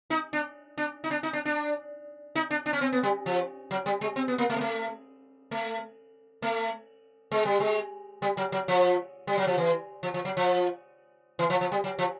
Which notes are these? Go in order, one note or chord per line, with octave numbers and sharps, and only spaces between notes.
D#4
D4
D4
D#4
D4
D#4
D4
D4
D#4
D4
D4
C#4
C4
B3
G3
F3
F#3
G3
G#3
C4
B3
A#3
A3
A#3
A3
A3
A3
G#3
G3
G#3
G3
F#3
F#3
F3
G3
F#3
F3
E3
F3
F3
F#3
F3
E3
F3
F3
G3
F#3
F3